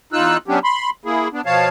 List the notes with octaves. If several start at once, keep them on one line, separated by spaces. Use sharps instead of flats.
E2 D#4 F4 E6 F#6
F#3 B3 C#4 D4 G4
B5 C6
A#3 E4 G#4
B3 D4
B2 F3 C#5 F5 A5